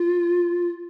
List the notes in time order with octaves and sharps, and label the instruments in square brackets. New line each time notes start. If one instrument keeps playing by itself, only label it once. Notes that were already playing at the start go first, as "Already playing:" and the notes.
Already playing: [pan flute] F4